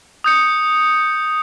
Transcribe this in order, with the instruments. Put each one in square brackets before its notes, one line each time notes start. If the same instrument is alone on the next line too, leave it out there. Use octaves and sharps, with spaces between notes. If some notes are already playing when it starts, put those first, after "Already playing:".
[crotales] D#6 G6 C#7